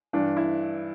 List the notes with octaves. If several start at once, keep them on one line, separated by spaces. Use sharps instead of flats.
G2 E3 D4
E4